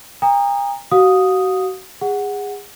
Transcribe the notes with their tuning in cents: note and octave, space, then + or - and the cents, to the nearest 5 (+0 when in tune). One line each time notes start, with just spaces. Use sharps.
G5 +45 A#5 +0 D#6 -10
F#4 +30 F5 +40 D#6 +0
G#4 -25 F#5 +0